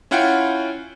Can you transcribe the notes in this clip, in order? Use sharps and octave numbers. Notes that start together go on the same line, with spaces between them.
C#4 E4 F4 F#5 G5